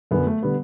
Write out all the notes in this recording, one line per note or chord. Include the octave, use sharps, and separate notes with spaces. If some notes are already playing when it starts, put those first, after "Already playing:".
F#2 D3 F#3 B3
A3
D3 G3 B3